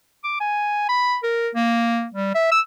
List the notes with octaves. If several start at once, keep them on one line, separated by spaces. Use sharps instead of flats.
D6
G#5
B5
A#4
A#3
G3
E5
E6